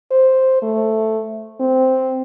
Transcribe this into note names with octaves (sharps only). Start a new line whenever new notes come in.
C5
A3
C4